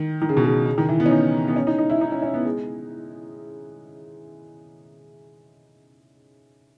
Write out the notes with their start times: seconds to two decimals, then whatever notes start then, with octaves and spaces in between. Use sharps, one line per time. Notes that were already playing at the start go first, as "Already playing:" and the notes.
Already playing: D#3
0.22 D#3
0.29 C#3
0.37 B2
0.44 C#3
0.66 C#3
0.78 D#3
0.89 E3
1.00 B3
1.06 C#4
1.11 D#4
1.48 B3
1.56 C#4
1.67 D#4
1.78 D#4
1.90 E4
2.01 D#4
2.12 C#4
2.22 C#4
2.34 B3
2.45 G#3